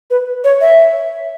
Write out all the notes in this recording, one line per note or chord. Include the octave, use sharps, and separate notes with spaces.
B4
C#5
E5